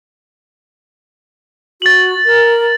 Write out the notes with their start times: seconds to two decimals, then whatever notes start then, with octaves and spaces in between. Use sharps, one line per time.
1.82 F#4 A6 F#7
2.26 A#4